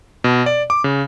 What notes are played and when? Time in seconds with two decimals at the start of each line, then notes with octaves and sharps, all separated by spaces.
0.24 B2
0.46 D5
0.70 D6
0.84 C#3